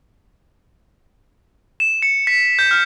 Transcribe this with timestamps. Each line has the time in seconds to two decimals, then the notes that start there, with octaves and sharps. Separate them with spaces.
1.80 E7
2.02 C#7
2.27 B6
2.59 G6
2.71 F6